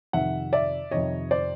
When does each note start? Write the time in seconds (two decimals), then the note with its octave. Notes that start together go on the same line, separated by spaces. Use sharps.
0.13 F2 C3 D#3 E5 F#5
0.53 D5 E5
0.91 F2 C3 D#3 C#5 D#5
1.31 C5 D5